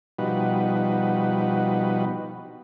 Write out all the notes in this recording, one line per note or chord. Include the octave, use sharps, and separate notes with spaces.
B2 F3 G3 D#4 F#4 B4